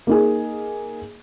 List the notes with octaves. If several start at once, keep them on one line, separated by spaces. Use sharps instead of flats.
A#3 D#4 G#4